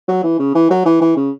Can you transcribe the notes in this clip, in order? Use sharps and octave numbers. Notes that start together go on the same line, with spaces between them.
F#3
E3
C#3
E3
F#3
E3
E3
C#3